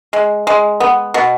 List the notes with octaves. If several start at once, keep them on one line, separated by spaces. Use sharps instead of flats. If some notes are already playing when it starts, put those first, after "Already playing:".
G#3
G#3
B3
B2